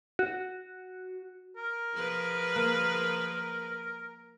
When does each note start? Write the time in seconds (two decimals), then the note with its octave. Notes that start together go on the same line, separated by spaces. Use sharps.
0.19 F#4
1.57 A#4
1.95 F3 G#4 B4
2.56 A#3